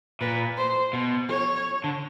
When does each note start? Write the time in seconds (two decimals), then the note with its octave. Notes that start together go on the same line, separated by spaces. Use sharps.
0.21 A#2 B4
0.57 C5
0.93 B2
1.29 C#5
1.84 D3